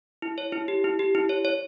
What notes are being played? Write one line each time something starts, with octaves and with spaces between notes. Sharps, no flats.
E4
C#5
E4
G4
E4
G4
E4
C#5
C#5